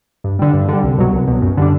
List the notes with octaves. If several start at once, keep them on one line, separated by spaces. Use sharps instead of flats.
G2
D3 G3
G2
D3 G3
C2
B2 F#3
C2
B2 F#3
F#2
D3 G3 D4